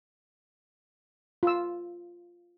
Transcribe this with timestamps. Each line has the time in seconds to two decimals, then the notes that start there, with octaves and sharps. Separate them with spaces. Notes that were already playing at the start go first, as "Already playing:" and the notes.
1.43 F4 E6